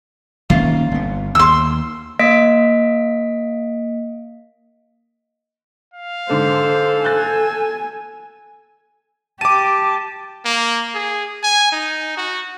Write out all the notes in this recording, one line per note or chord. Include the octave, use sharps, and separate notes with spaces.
D#3 A#3 C#4 F4
G1 B3
D#2 C6 E6
A#3 D#5 B6 D7
F5
G#2 D3 A4 C5
G#5 F#6 G6 A6
G4 A5 D6 D#7
A#3
G#4
G#5
D#4
F#4